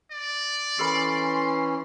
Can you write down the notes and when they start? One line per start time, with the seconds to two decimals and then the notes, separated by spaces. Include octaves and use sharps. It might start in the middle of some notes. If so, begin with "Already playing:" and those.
0.11 D5
0.79 E3 C#4 A4 A#4 B5 C6